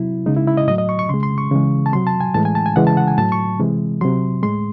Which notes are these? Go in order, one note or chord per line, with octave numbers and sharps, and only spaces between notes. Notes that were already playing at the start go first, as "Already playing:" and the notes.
Already playing: C3 F#3 E4
C#3 G#3 D#4
E4
E4
D#5
A2 F#3 D#5
D#5
C#6
C#6
C#3 G#3 C6
C6
C#6
C#3 E3 G#3
A5
C3 F#3 C6
A5
G#5
A2 E3 G#3 A5
G#5
A5
G#5
C#3 E3 G#3 F#5
A5
F#5
G#5
A2 F#3 A5
C#6
C3 E3 G#3
C3 F#3 C6
A2 G#3 C6